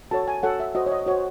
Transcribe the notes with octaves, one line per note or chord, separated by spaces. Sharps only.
F#4 A4 C#5 A5
G#5
F#4 A4 C#5 F#5
E5
F#4 C5 D#5
C#5
D#5
F#4 C5 C#5